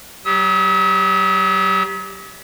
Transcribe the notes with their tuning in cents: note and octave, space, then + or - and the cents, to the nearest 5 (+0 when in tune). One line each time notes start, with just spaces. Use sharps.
F#3 +35 G4 +0 D#6 +45